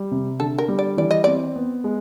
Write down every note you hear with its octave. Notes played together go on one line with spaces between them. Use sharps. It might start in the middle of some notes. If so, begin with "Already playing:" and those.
Already playing: G3
C3
D3 A4
A#4
G3
D5
E3 D5
D#5
C4 D5
B3
G#3